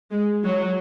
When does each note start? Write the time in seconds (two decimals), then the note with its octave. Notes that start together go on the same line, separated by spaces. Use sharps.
0.11 G#3
0.44 F#3